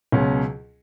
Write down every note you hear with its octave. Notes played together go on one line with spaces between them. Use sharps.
C#2 B2 F#3 C#4